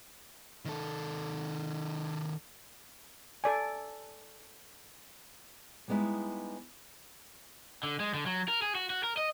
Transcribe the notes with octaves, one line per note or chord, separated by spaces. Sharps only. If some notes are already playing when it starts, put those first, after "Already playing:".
D#3 A4
A4 D5 G#5
G3 G#3 B3 D#4 E4
D3
G#3
D3
F#3
A#4
G#4
F#4
F#4
A#4
D#5